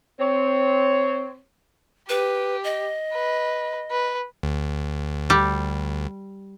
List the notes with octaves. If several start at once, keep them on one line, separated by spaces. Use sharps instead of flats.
C4 C#5
G4 B4
D#5
B4
B4
D2
G3